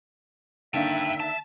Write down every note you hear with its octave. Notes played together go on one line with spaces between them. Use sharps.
D3 D#3 A#3 E5 G5 A5
A5